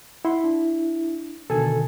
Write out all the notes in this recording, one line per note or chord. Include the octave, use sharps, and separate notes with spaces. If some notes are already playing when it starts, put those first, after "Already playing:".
E4 F#5 B5 C6
D4
B2 D3 D#3 A4 G#5